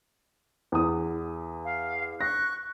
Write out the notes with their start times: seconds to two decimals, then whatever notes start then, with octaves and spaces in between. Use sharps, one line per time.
0.72 E2 D#6
1.64 F5
2.21 C#6 F#6 A#6